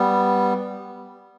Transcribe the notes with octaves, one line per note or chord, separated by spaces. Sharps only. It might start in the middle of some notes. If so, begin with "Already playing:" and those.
Already playing: G3 B3